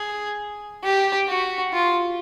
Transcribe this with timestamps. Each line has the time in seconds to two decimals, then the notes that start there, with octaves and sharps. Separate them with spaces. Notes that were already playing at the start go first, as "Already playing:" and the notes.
Already playing: G#4
0.83 G4
1.28 F#4
1.73 F4